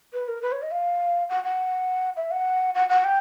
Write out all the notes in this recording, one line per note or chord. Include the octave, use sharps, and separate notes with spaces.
B4
A#4
B4
C#5
D#5
F5
F#5
F#5
E5
F#5
F#5
F#5
G5